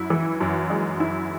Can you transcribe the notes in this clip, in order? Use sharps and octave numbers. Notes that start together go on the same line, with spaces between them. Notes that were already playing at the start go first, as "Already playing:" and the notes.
Already playing: F#2 E4
E3
F#2
G#3
E4